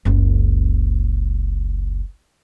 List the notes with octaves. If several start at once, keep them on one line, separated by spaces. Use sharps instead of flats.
F#1 C#2